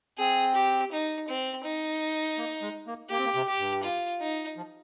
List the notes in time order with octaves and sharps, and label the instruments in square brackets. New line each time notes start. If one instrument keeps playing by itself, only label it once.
[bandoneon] C4 [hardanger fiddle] G#4
[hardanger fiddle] G4
D#4
C4
D#4
[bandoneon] A#3
G#3
A#3
[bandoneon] A#3 [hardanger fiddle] G4
[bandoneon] C4
A#3
C3
[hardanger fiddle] G4
[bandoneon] G2
[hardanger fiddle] F4
D#4
[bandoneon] F3